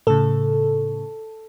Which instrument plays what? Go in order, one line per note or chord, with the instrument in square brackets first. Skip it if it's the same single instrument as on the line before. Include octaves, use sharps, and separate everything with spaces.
[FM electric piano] A2 C#3 [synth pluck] A4